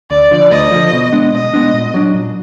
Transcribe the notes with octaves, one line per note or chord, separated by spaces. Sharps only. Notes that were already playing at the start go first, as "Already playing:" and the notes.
D2 D5
D3 F3
D2 D#5
D3 F3
B2
G#3 B3 D4
B2 D#5
G#3 B3 D4
A#2
F#3 D4
A#2